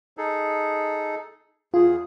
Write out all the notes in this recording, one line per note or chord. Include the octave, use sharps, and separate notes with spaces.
D#4 G#4 A4
E2 F4 G#4